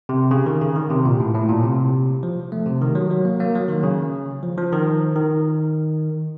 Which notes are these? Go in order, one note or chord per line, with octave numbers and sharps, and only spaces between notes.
C3
C#3
D#3
C#3
D#3
C3
A#2
A2
A2
A#2
C3
F3
A3
C3
D#3
F#3
F#3
A#3
A#3
F#3
D#3
C#3
F3
F3
D#3
D#3